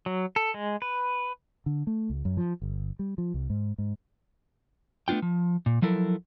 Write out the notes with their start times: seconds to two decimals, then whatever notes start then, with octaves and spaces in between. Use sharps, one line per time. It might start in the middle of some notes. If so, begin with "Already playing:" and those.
0.06 F#3
0.36 A4
0.54 G#3
0.82 B4
1.66 D3
1.87 A3
2.10 C#2
2.25 F#2
2.37 F3
2.62 G1
2.99 G3
3.18 F3
3.34 C2
3.50 G#2
3.78 G#2
5.08 A3 B3 D4 F4 G5
5.22 F3
5.66 A#2
5.82 F3 F#3 E4 A4 A#4